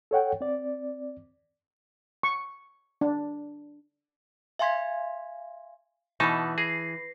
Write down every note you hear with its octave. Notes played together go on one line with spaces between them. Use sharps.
A4 C#5 F#5 G5
C4 D5
C#6
D4
E5 F5 G#5 C6 G#6 B6
B2 E3 D#4 A5 B5 C#6
G#4 A#6 C7